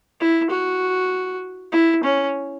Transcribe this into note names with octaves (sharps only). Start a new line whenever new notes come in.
E4
F#4
E4
C#4